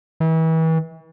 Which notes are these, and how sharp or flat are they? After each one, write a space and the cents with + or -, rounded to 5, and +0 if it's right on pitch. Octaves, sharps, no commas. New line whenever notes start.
E3 -35